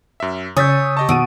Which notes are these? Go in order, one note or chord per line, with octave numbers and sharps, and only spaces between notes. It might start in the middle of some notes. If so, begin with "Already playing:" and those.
F#2 E5
C#3 C#5 G#5 D#6 E6 G6 A6 B6
G4 D#5 A5 C#6
B2 D#3 D#6 E6 D7 D#7